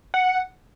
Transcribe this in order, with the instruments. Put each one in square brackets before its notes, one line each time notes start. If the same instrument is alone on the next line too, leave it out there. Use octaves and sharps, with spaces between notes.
[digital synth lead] F#5